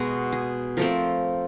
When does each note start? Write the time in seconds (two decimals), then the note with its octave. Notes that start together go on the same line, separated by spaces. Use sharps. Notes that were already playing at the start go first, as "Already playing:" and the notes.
Already playing: B2 G#3 B3 F#4
0.32 G#4
0.77 F3 A3 C4 A#4